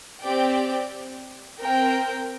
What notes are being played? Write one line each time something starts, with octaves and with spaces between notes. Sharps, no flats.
C4 G4 D5 G5
C4 A#4 G5